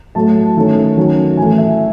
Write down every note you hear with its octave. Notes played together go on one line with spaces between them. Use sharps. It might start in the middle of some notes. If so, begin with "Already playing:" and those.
A2 F#3 A3 A5
D#3 A3 C#4
D#3 F#3 C#4
A2 E3 A3 G#5
E5